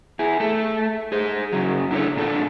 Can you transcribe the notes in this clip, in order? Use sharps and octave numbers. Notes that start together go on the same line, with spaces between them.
E4 G#4
A3 A4
G#4 C5
F#2 C#3 F#3
D4 E4 G4 A4 C#5
A#2 D4 A4